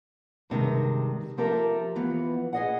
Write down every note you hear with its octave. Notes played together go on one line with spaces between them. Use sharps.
G2 C3 D#3 G#3
F3 C4 G4 A4 A#4 E5
E3 F3 B3
G#4 D#5 F#5